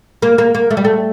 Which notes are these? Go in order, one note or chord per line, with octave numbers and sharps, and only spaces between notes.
A#3
A#3
A#3
A3
G3
A3